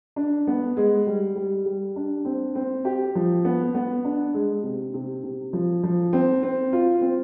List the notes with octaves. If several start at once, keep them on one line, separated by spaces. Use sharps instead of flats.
D4
B3
G#3
G3
G3
G3
D4
C4
C4
G4
F3
B3
B3
D4
G#3
C3
C3
C3
F3
F3
C4
C4
F4
C4